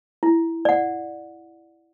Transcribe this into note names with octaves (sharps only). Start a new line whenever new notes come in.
E4
D5 F#5